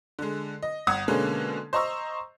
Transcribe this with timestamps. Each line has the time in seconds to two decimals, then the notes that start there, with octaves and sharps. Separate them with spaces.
0.19 D3 G#3
0.63 D#5
0.87 G1 F#5 D#6 G#6
1.08 B2 D3 G#3 A#3 C#4
1.73 C5 D#5 A#5 C#6 E6